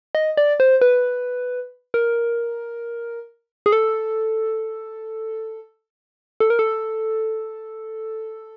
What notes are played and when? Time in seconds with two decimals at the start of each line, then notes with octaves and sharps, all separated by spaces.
0.15 D#5
0.37 D5
0.60 C5
0.82 B4
1.94 A#4
3.66 G#4
3.72 A4
6.40 A4
6.50 A#4
6.59 A4